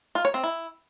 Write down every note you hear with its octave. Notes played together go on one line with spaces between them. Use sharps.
F4
C#5
C4
E4